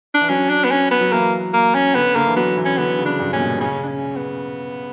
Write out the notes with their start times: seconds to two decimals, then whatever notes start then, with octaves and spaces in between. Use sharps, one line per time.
0.15 D4
0.21 E3
0.29 F#3 C#4
0.50 D4
0.64 B3
0.71 C#4
0.91 B3
1.01 F#3
1.12 E3 A#3
1.54 A#3
1.75 C#4
1.95 D3 B3
2.16 D3 A#3
2.27 E3
2.36 F#3 B3
2.57 E3
2.65 C#4
2.78 D3 B3
2.99 C#3
3.06 D4
3.20 G2
3.33 A#2 C#4
3.40 B2
3.61 C#3 C#4
3.84 D4
3.88 C#4
4.17 B3